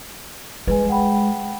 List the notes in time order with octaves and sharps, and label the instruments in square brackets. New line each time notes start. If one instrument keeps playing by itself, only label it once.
[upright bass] G#3 [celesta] B4 G#5
[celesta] F#5 G5 B5